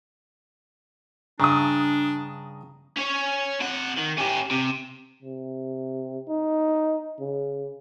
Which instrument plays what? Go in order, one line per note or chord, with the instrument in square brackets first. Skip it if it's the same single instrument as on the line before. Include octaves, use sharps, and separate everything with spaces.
[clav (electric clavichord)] G2 C#3 [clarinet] D4 [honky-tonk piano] A#5 D#6
[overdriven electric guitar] C#4 C#5
C3 F#5
D#3
C#4 G4
C3
[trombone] C3
D#4
C#3